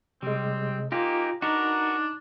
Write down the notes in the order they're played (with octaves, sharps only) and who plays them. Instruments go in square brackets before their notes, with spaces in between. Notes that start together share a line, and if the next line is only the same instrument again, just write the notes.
[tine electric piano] C3 G#3 [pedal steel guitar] G3 [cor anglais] C4
[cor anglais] A#3 [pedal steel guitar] D#4 G4 G#4 [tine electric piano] F4
[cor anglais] D4 [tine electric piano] D#4 [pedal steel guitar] F#4 A#4 B4